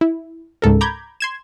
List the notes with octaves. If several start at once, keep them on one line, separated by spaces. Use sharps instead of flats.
E4
C#2 G#2 A4 A#4
A#5 B5 D6 G6 G#6
C6 G#6 E7